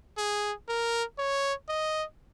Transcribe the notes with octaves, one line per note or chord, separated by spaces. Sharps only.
G#4
A#4
C#5
D#5